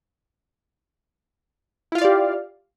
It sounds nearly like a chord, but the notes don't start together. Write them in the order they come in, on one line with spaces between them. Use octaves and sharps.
E4 F4 F5 D5 G4